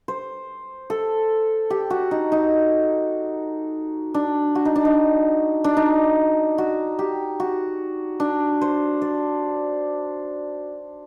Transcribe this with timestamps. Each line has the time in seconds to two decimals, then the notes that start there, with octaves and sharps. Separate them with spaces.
0.08 C5
0.90 A4
1.70 G4
1.90 F#4
2.11 D#4
2.32 D#4
4.14 D4
4.55 F#4
4.65 D#4
4.76 D4
4.85 D#4
5.64 D4
5.77 D#4
6.58 F#4
6.99 G4
7.40 F#4
8.20 D4
8.62 C5
9.02 D5